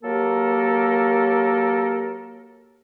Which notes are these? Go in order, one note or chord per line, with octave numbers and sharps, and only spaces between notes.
F#3 A#3 G4 A4 A#4